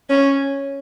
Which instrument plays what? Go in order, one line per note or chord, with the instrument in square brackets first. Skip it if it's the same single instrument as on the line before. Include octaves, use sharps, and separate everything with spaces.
[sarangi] C#4